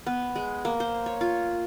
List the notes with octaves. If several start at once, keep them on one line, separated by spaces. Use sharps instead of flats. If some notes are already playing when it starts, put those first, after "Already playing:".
B3
G#3
A#3
C5
C#5
F4